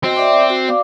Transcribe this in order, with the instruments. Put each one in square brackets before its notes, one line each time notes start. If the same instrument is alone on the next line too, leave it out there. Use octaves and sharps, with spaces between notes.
[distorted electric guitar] C4 [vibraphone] F#4 D#5
[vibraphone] D5 E5 D6
F#4
D5 F5 D6